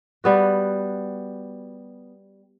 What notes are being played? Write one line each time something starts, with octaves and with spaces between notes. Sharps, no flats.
G3 B3 F#4